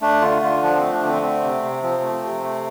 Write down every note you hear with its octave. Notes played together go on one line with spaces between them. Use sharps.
A3 D4
D3 F4
D3 F4
F3 D4
A3 C4
D4
D3 C4
A3 C4
C3
C3
F3 C4
A3
C3
A3